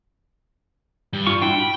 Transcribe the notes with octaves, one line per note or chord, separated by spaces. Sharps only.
G2
F4 C#6
D4 E4 F#4 G5
B5